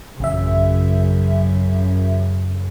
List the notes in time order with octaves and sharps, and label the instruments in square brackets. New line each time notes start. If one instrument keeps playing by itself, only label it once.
[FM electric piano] A1 E5 [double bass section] F#2 C#3